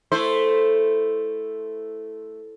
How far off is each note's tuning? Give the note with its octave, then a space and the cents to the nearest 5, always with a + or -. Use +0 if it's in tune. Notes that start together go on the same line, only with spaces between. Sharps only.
A3 +0 E4 +0 C5 +0